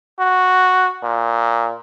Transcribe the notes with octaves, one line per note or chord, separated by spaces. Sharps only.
F#4
A#2